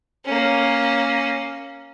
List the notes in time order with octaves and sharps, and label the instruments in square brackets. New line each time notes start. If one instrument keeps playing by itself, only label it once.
[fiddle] A#3 C#4